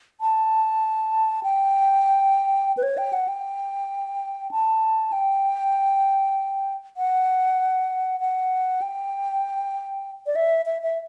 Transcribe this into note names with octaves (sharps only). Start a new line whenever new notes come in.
A5
G5
B4
C#5
G5
F#5
G5
A5
G5
F#5
F#5
G5
D5
E5
E5
E5